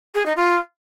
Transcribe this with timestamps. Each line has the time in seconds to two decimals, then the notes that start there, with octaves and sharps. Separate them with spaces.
0.14 G#4
0.25 D#4
0.36 F4